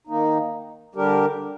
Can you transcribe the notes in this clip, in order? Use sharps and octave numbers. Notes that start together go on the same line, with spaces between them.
D#3 A#3 D#4
D3 G3 D4 G4 A#4